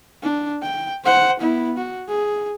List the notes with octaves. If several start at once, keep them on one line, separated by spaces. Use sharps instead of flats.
D4
G5
C5 F#5
B3 E4
F#4
G#4